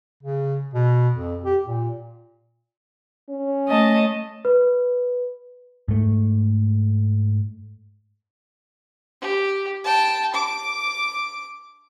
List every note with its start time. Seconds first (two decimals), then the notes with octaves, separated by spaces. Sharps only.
0.23 C#3
0.74 B2
1.16 F2
1.44 G4
1.66 A#2
3.29 C#4
3.68 A3 D#5 A5
4.45 B4
5.88 G#2 A3
9.22 G4
9.84 G5 A5
10.34 D6